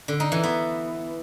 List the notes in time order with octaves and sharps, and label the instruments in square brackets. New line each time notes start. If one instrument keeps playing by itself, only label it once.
[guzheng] D3
D#4
E3
B3